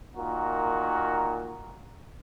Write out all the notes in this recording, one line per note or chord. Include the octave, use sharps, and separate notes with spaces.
A#2 D#3 F#4 A#4